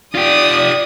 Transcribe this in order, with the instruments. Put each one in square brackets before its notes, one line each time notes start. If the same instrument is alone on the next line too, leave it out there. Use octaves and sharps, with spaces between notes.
[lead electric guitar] F4 G4 [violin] D5 D#6